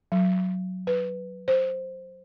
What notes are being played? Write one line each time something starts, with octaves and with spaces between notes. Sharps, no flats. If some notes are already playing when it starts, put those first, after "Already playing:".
F#3
B4
C5